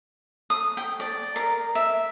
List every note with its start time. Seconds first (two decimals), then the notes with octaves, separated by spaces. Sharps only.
0.50 D#6
0.77 G5
1.00 D5
1.36 A#4
1.75 E5